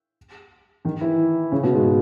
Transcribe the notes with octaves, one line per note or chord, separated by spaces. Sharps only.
D#3 D#4
E3 E4
C#3 C#4
B2 B3
G#2 G#3